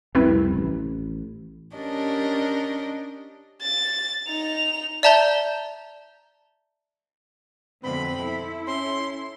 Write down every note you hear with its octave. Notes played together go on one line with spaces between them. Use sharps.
F1 C2 C4 E4 B4
A1
C#4 D4 G4 A#4 D#5
A6
D#4 F7
D5 E5 A5 A#5 G6 G7
F2 B2 D3 C4 B5
E4 A4
C#4 C6